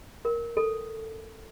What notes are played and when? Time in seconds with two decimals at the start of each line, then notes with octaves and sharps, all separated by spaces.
0.25 A#4
0.57 A4